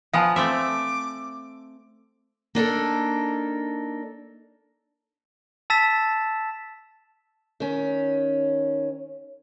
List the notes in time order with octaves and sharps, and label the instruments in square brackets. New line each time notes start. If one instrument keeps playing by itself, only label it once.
[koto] F3 B3 [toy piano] F5 G#5 A5
[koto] A3 C4 E5 [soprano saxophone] D6
[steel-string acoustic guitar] A#3 D4 D#4 A4
[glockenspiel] A5 E6 A6 B6 E7
[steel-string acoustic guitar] D#3 C#4